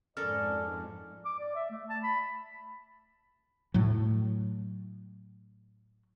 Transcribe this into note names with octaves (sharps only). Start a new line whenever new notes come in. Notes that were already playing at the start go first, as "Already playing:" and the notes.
F2 G#2 C#4 A4 A#4 D5 F6
D6
D5
E5
A3
A5
B5
A2 F#3